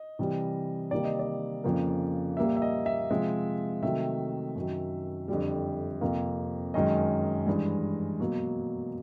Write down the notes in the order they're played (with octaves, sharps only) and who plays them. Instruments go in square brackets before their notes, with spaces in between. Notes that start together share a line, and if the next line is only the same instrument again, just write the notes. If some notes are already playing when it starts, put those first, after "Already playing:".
Already playing: [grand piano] D#5
C3 E3 G3
C3 D#3 G3 A#3 D5
D#5
D5
F2 C#3 F3 A#3
A#2 G3 A#3 E5
E5
D#5
E5
C3 F3 G#3
C3 D#3 F#3 A3 E5
F#2 D#3 F#3
F2 D3 G3
F2 C3 F3 A#3
F#2 D#3 G#3 D#5
G2 E3 G#3
B2 F#3 A#3